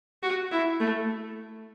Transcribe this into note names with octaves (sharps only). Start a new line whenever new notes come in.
F#4
E4
A3